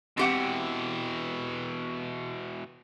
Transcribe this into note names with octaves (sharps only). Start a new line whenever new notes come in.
B2 E3 C4 G4 F#5